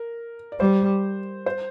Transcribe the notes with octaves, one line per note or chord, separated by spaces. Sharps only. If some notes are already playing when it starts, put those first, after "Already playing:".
Already playing: A#4
D5
G3 C5
C5